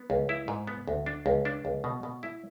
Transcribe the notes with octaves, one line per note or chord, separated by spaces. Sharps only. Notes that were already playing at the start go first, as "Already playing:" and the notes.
Already playing: B3
C#2
E4
G#2
B3
D2
D4
C#2
D4
C#2
B2
B2
E4